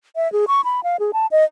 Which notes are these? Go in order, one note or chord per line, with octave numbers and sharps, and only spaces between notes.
E5
G#4
C#6
B5
F5
G#4
A5
D#5